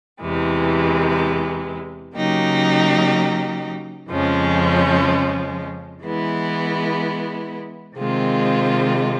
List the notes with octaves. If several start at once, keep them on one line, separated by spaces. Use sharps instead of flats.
E2 C3 E3 G#3
C#3 F#3 A#3 D#4 G4
F2 C#3 F3 G#3 C#4
E3 G#3 B3 E4
C3 D#3 G#3 C4 F4